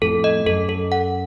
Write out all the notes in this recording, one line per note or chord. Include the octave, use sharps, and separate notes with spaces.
F2 A2 A4
D#5
F#2 A4
A4
F#5